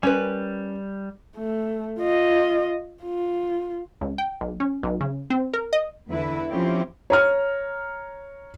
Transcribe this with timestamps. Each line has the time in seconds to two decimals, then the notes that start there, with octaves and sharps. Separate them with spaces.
0.03 G3 C#4 A#4 B4
1.37 A3
1.99 F4 D#5
3.03 F4
4.01 C#2
4.18 G5
4.41 B1
4.60 C#4
4.83 B1
5.01 C#3
5.30 C4
5.54 A#4
5.73 D#5
6.10 E2 D3 E3 E4 B4 E5
6.51 F3 C4 C#4 E4 F4 G4
7.10 C#5 A#5 F6